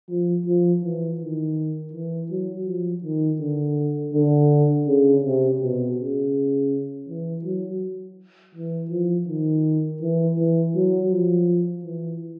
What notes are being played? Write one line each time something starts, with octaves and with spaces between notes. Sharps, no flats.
F3
F3
E3
D#3
E3
F#3
F3
D#3
D3
D3
C#3
C3
B2
C#3
E3
F#3
E3
F3
D#3
E3
E3
F#3
F3
E3